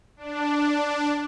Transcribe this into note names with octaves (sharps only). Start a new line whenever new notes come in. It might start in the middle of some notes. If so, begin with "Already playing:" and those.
D4